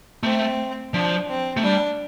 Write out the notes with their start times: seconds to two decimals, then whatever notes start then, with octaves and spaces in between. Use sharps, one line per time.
0.23 A3 C4
0.94 F3 D4
1.28 C4
1.57 A3
1.63 G3 D4